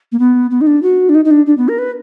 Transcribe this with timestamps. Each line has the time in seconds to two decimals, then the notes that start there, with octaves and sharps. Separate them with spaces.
0.12 A#3
0.19 B3
0.51 B3
0.61 D#4
0.67 D4
0.83 F#4
1.09 D4
1.15 D#4
1.25 D#4
1.31 D4
1.46 D4
1.57 B3
1.68 A#4
1.78 B4